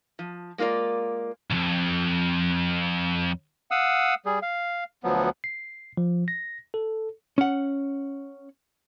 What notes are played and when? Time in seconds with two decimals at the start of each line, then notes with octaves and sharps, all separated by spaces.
0.19 F3
0.58 G#3 A#3 F4 A#4 D5
1.51 B1 F2
3.71 F5 F#5 D#6 E6
4.26 G3 G#4
4.43 F5
5.04 D2 F3 F#3 B3
5.44 C7
5.97 F3
6.28 A#6
6.74 A4
7.38 C#4 F#5